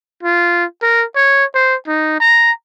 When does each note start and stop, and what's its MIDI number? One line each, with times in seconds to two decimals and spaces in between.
0.23 0.64 65
0.82 1.04 70
1.16 1.45 73
1.55 1.75 72
1.87 2.18 63
2.20 2.51 82